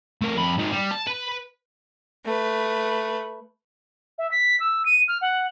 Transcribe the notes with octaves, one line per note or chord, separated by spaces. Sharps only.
A3 A#4
F2 B5
G#2 D#3
G3
A5
B4
A3 B4
E5
B6
E6
D#7
F6
F#5